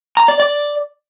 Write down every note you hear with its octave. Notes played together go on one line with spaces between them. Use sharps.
A#5
D5
D5